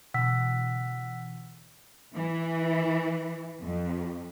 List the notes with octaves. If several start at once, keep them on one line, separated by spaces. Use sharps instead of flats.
B2 D3 E3 F#5 E6 B6
E3
F2